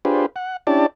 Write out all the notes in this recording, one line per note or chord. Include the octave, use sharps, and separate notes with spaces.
D4 F4 G4 G#4 B4 C5
F#5
C#4 D4 E4 G4 D5 A5